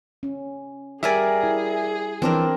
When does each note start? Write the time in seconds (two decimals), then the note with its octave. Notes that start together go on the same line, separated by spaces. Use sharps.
0.23 C#4
1.03 G3 G#4 A#4 D5 E5 G#5
1.43 E4
2.22 E3 F3 C4 D4 A#4